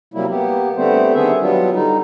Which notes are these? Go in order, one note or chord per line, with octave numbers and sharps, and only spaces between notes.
C3 F#3 G3 A#3 E4
A#3 B3 G4
D3 G3 A3 B3 C4 C5
D#3 B3 D4 G#4 E5
F#3 G3 B3 D4 F4
D3 G3 D#4